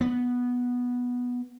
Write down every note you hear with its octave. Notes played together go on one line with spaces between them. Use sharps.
B3